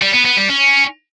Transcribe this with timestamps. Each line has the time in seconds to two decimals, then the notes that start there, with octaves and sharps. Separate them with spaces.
0.02 G3
0.14 B3
0.25 B3
0.37 G3
0.48 C#4